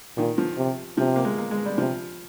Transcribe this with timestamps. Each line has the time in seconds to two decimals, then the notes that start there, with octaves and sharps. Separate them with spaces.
0.17 A#2 D#3
0.38 F3
0.57 C3
0.97 C3 F3
1.16 A#3
1.25 G#3
1.38 A#3
1.51 G#3
1.66 G3
1.78 C3 F3